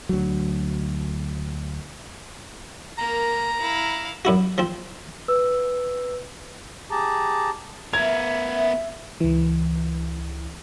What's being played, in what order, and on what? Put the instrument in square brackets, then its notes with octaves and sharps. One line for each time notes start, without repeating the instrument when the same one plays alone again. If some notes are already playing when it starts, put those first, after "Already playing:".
[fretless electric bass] D2 F#3
[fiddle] A#3 A#4 [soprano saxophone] A#5
[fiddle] E4 F5
[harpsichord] F#2 E4 F#4
F3 C4
[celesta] B4 E6
[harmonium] G4 G#4 A5 A#5
[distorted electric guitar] B3 A#4 [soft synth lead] E5 [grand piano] G#6
[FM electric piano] C#2 E3